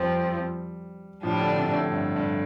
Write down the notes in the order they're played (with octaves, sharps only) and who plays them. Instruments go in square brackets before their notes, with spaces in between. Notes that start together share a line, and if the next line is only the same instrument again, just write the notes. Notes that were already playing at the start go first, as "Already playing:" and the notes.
Already playing: [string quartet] F2 F3 C4 [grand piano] G3
[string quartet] A2 G3 D4 [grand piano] F3
[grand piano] D3
C3
A2
G2
G2